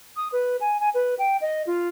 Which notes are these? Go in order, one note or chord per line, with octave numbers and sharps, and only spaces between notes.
D#6
B4
G#5
G#5
B4
G5
D#5
F4